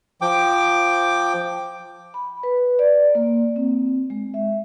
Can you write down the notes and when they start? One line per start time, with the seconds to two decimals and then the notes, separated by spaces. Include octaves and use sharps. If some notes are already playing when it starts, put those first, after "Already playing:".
0.21 F3 G5 D6
2.14 B5
2.43 B4
2.79 D5
3.15 A#3
3.56 C4
4.10 G#3
4.34 E5